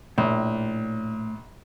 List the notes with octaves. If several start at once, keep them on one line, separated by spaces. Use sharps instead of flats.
A#1 A2